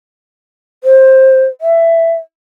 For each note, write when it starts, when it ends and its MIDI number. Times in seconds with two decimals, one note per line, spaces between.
0.84 1.46 72
1.61 2.13 76